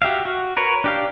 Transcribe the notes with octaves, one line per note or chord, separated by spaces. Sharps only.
F#4 G4 E5 F5
F#4
A#4 B4 C#5
D4 G4 F5